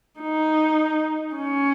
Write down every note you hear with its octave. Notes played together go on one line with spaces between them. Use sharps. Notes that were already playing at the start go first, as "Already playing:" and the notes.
D#4
C#4